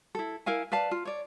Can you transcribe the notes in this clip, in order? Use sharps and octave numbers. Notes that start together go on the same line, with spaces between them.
E4 A4
E4 A#4 F5 G#5
B4 D5 F5 A5
F4
C#5 D5